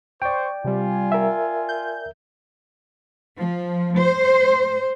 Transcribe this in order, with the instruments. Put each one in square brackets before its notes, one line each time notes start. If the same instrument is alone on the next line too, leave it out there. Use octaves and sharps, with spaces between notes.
[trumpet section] C5 C#6 [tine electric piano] D5 G5
[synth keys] C3 G3 [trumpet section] F4 G#5
[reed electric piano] A#4 E5
[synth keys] G6
[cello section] F3
C5